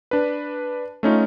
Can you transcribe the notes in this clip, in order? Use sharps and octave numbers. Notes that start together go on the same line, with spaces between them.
D4 B4
A3 C#4 D#4 F4